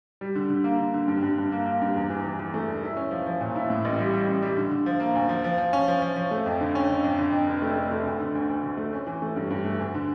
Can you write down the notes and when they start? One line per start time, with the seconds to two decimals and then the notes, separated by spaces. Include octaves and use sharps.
0.21 G3
0.35 D3
0.50 D3
0.64 A#3
0.80 D3
0.94 D3
1.08 G2
1.22 G2
1.38 G2
1.52 A#3
1.66 A#3
1.82 G2
1.96 E2
2.10 E3
2.24 E3
2.39 E3
2.54 A3
2.68 E1
2.83 E4
2.97 C#4
3.11 F3
3.26 F3
3.41 A#2
3.56 E4
3.70 A2
3.85 A1
3.99 G3
4.14 G3
4.28 A1
4.42 G3
4.57 D3
4.71 D3
4.86 F3
5.00 A#3
5.15 D2
5.29 F3
5.44 F3
5.58 F3
5.73 C#4
5.88 F3
6.02 F3
6.16 F3
6.31 A3
6.46 F2
6.61 D3
6.75 C#4
6.90 D3
7.04 F2
7.19 D3
7.32 F2
7.47 F1
7.62 A3
7.77 A3
7.91 A3
8.05 D2
8.20 D3
8.35 D2
8.49 D2
8.63 D2
8.77 A3
8.93 C#4
9.07 E3
9.22 A3
9.36 G2
9.50 G2
9.65 A3
9.79 D2
9.95 D3